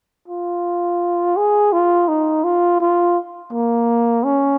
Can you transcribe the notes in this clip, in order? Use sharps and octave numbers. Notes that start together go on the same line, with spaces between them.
F4
G#4
F4
D#4
F4
F4
A#3
C#4